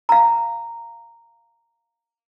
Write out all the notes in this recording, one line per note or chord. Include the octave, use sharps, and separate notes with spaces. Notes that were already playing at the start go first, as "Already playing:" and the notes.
F5 A#5